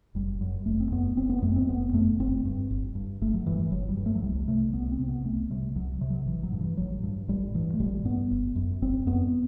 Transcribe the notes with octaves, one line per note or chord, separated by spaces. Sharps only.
F#1 G3
F#2
F#1 A3
C4
F#2 B3
F#1 C4
B3
F#2 A3
C4
F#1 B3
F#2 A3
G1 C4
G2
G1
G2
G1 A3
F#3
G2 E3
E3
G1 F#3
G3
G2
A3
F#3
C2 G3
C3 A3
C2 B3
C4
C3
B3
C2 A3
C3 G3
C2 F#3
C3
F#3
A1 E3
F#3
G2
E3
A1 F#3
G2
A1 G3
G2 E3
A3
A1 G3
G2 B3
G1
F#2
G1 C4
F#2 B3